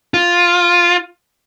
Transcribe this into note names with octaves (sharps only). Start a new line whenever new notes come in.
F4